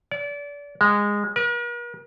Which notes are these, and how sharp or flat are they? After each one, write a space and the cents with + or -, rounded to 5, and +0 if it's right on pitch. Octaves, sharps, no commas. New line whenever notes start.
D5 -30
G#3 -15
A#4 +45